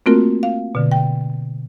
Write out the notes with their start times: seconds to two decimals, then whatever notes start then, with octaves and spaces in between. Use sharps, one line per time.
0.06 A3 A#3 C4 F4 F#4 A#4
0.43 F5
0.75 B2 D3
0.92 G5